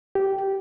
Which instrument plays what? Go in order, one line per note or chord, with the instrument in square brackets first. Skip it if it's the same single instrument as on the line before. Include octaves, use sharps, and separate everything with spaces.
[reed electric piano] G4